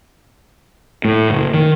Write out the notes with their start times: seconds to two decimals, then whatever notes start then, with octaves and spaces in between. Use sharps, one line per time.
1.05 A2
1.30 F#1
1.54 D#3